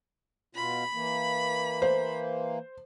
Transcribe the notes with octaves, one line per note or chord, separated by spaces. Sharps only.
B2 F4 B5
E3 A#3
C5